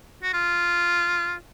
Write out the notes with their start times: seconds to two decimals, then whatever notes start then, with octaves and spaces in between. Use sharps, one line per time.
0.23 F#4
0.34 F4